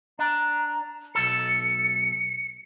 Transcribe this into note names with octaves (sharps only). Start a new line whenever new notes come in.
D4 A#5
B1 A4 C#7